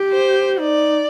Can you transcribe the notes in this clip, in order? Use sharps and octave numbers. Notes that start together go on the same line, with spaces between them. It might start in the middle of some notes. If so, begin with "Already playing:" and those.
Already playing: G4
C5
D#4 D5